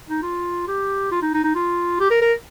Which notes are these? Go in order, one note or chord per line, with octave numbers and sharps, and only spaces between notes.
D#4
F4
G4
F4
D#4
D#4
D#4
F4
G4
A#4
A#4